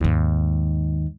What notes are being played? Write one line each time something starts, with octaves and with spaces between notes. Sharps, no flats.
D#2 G#2